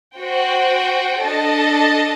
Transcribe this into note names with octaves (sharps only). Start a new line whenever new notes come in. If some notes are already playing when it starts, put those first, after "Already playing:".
F#4 C5 G5
D4 A4 D#5 A5